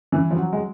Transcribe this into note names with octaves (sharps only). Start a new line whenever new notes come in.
E3
F3
F#3
G#3